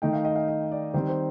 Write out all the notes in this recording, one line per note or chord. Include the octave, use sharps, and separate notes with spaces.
D#3 A3 D#4 G5
F5
D#5
F5
D#5
D5
D#3 G3 C4 C5
C5